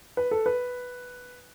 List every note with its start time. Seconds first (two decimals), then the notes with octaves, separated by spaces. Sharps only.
0.17 B4
0.31 A4
0.46 B4